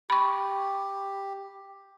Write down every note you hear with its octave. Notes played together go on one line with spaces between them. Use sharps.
G4 B5 C#6